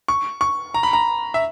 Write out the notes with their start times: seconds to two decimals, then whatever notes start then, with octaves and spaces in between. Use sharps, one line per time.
0.08 C#6
0.41 C#6
0.74 A#5
0.83 B5
0.93 A#5
1.34 E5